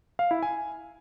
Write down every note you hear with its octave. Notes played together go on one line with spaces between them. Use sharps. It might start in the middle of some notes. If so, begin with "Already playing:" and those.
F5
E4
G#5